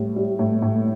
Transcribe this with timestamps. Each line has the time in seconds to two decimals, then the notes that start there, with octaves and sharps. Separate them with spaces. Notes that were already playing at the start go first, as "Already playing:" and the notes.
Already playing: A2 G3
0.16 G3
0.39 A2
0.62 A2